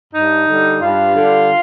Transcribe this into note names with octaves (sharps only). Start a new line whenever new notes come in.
G2 D#4
D3 G3
G2 F4
D3 G3